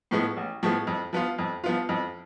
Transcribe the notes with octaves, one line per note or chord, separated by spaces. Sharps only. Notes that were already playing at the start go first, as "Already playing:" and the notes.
A2 F3 G#3 B3
A1
A2 F3 G#3 B3
F2
F3 B3 F4
F2
F3 B3 F4
F2